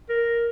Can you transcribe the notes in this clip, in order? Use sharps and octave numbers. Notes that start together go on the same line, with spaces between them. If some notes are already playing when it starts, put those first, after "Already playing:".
A#4